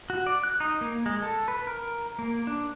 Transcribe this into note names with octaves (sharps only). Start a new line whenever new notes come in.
F#4
D5
F#6
D#4
A#3
G#3
A4
B4
A#4
A#3
D4